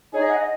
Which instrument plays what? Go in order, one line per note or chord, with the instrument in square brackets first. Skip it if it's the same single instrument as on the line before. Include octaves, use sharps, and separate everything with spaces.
[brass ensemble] D#4 G#4 [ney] C#5
[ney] D#5
F#5
D#5